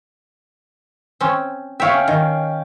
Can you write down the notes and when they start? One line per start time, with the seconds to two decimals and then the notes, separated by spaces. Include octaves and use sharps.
1.21 C4 C#4
1.80 C#5 E5 F5 G5
1.94 C#4
2.08 D#3